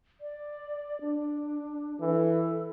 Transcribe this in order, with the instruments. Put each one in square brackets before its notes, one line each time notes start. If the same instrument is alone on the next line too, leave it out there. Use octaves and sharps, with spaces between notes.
[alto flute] D5
D4
[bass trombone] E3 [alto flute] A4